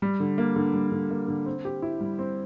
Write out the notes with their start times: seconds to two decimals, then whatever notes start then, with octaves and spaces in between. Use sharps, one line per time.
0.02 G3
0.20 D3
0.38 A#3
0.56 D3
0.74 G3
0.92 D3
1.11 A#3
1.28 D3
1.46 C4
1.65 G4
1.82 E4
2.01 G3
2.19 C4